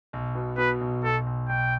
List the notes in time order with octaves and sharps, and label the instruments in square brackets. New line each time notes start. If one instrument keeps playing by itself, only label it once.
[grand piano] B1
B2
[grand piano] B2 [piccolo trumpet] B4
[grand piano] B1
[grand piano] B1 [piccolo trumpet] A4
[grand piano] B1
[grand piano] B1 [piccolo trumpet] G5